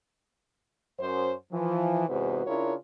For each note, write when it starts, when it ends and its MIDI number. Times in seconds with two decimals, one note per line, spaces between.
0.99 1.32 42
0.99 1.32 72
1.52 2.07 52
1.52 2.07 53
2.09 2.44 40
2.09 2.44 44
2.09 2.44 48
2.09 2.44 66
2.09 2.44 71
2.09 2.44 72
2.47 2.74 49
2.47 2.74 62
2.47 2.74 64
2.47 2.74 65
2.47 2.74 70
2.47 2.74 73